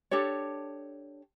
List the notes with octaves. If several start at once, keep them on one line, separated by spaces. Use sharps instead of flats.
D4 G4 A4 C#5